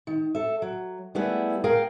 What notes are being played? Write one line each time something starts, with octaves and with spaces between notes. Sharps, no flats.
D#3
A4 E5
F#3
G3 A3 B3 E4 G#4
G#4 A#4 F5 G5